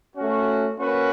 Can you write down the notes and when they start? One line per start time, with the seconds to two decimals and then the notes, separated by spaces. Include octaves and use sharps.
0.16 A3 C#4 F#4
0.78 A#3 C#4 F#4 B4